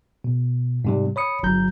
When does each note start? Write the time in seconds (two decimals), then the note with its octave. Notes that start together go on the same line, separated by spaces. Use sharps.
0.24 B2
0.85 G#2 C3 G3
1.16 C#5 B5 D#6 C#7
1.43 G1 F#3 A#5 G6